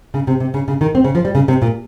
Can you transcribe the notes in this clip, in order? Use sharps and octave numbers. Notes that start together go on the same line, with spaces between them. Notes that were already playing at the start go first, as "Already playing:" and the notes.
C#3
C3
C3
C#3
C#3
D#3
C4
C#3
F3
G3
C#3
C3
A#2